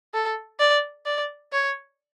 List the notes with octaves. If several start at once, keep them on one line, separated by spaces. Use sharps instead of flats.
A4
D5
D5
C#5